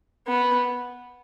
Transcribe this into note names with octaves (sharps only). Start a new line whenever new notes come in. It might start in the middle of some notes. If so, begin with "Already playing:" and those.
B3